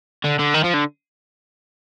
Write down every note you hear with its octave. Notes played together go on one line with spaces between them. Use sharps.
D3
D3
D#3
F3
D3